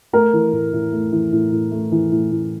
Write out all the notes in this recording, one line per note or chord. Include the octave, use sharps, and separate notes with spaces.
A3 A#4
E3
A2
A2
A3
E3
A2
A2
A3
E3
A2
A2